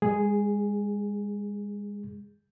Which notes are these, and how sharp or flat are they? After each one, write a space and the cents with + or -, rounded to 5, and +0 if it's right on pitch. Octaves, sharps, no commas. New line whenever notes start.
G#3 -35 G#4 +0